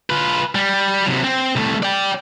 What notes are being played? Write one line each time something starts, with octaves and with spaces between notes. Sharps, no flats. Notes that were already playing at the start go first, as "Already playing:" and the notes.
F4 B4
G3
C3 F#3
C4
C2 A3
D5 G5